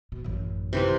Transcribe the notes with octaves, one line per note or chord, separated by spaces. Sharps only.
B2
A1 F#2
C3 E3 C4